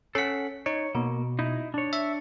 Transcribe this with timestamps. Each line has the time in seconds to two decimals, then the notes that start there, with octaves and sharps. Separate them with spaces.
0.15 C#4 A4 F#5 B6
0.66 D#4 C#5
0.95 B2 A#3
1.39 D#4 E4
1.74 D4 C#5
1.93 E5